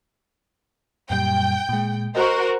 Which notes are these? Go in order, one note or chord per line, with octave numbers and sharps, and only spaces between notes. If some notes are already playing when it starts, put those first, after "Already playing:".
F#2 A#2 G3 G5
A#2 G#3
F#4 A#4 C5 D#5